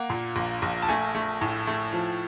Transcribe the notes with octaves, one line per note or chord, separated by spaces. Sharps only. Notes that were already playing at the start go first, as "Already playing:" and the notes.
Already playing: A#3 F#5
A#2
A#1
A#1
A5
A3 G#5
A3
A2
A3
F3